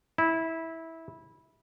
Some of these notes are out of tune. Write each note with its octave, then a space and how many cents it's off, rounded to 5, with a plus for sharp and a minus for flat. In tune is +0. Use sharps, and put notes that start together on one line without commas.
E4 -15